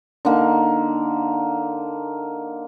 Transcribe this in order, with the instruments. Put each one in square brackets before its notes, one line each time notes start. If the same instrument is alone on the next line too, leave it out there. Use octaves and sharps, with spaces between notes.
[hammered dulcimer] D3 A#3 D#4